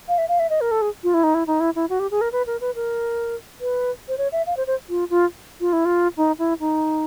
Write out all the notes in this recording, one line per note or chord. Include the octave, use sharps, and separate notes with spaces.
F5
E5
F5
E5
D#5
A#4
A4
G#4
F4
E4
D#4
E4
D#4
E4
E4
F#4
G4
G#4
A#4
B4
A#4
B4
A#4
B4
C5
C#5
E5
F5
C5
C5
F4
F4
F4
E4
F4
D#4
E4
D#4